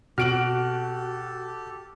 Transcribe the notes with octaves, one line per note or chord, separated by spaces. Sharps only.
B2 C4 F#4 G4 A4 F6 D7 F#7